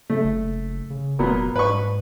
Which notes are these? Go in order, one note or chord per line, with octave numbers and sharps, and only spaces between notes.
C#3 A3
F#1
C#3
F1 A#2 F#3 B3
G#2 B4 C#6